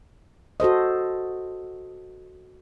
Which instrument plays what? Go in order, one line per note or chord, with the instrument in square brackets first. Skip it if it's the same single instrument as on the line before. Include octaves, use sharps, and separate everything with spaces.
[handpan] F#4 A4 C5 D#5